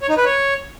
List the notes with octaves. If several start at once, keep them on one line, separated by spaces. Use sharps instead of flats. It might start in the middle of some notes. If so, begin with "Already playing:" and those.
C#5
D#4
B4
C#5